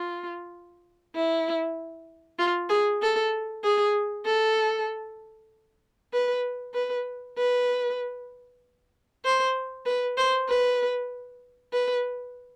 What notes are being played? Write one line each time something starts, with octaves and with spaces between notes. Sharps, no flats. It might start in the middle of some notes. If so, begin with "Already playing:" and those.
Already playing: F4
E4
F4
G#4
A4
G#4
A4
B4
B4
B4
C5
B4
C5
B4
B4